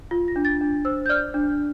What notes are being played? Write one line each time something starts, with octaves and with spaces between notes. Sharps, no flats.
F4
A#6
D4
A6
D4
C5 E6
G6
D5 F6
D4